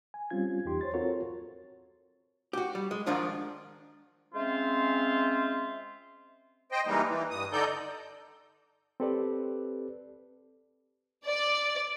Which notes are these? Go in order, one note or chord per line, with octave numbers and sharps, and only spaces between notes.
G#5
G3 C4 C#4 F4 G#6
E2 D#4 G4 C6
C5 C#5 C6 A6
C4 F4 F#4 A4 A#4 C#5
F#4 G4
G3
G#3
G#2 D#3 F3 D4 F4
G#3 C4 C#4 F4 C5 E5
C5 D#5 G5
E3 G3 G#3 A#3 D#4
E3
G2 D#6
D3 D#4 A4 D5 G6
C4 G4 A4 B4 D5
D5